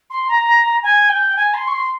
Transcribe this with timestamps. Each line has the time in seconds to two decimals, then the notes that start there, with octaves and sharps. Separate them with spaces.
0.10 C6
0.28 A#5
0.83 G#5
1.09 G5
1.36 G#5
1.54 C6
1.67 C#6
1.71 C6